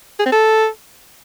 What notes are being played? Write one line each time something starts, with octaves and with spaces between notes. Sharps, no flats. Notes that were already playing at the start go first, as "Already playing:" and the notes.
G#4
C4
A4